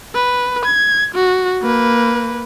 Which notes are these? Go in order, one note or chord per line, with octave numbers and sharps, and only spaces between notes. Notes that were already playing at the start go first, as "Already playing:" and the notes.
B4
G#6
F#4
A#3 B4